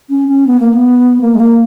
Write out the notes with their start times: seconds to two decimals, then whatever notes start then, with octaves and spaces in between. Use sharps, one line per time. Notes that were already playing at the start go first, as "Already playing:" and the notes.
0.10 C#4
0.29 C#4
0.47 B3
0.60 A#3
0.73 B3
1.21 A#3
1.35 G#3
1.40 A#3